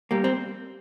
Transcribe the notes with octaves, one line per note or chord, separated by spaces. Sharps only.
G3 A#3
C4